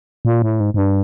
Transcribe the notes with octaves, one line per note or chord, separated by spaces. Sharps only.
A#2
A2
G#2
G#2
G2